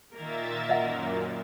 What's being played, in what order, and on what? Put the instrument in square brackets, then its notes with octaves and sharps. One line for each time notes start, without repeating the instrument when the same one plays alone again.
[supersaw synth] A#2 E5 A6 [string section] D#3 A#3 A#4
[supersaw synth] F#2 A#2 [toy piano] D#5 E5 F#5